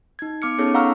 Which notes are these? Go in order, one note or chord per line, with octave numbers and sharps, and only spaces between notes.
D#4 G#6
B3 D6 F6 C#7
B3 C#4 D#4 G#4 A4 C#5
F5 F#5 A#5 C#6 E6 F6